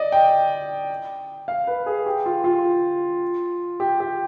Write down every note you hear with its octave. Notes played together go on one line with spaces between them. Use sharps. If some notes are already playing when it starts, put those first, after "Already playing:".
Already playing: D5 D#5
G5
F5
B4
G#4
G4
F4
F4
G4
G4